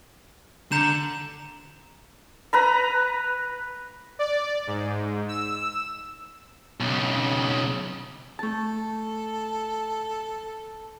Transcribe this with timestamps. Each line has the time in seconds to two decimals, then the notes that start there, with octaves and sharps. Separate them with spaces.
0.72 D3 A#5 G6 E7
2.53 B4 A#5 B5
4.19 D5
4.67 G#2
5.28 E6
6.80 B1 C#3
8.39 A3 A4 A5